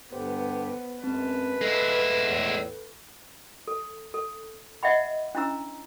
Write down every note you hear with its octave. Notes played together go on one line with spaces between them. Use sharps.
G2 D3 B3 G4 C5
F#2 G#3 C4 B4 A5
G#3 E4 A4 F5
E2 A2
A4
A4
D#5 E5 F#5 G5 B5
C#4 D4 E4 A#5 E6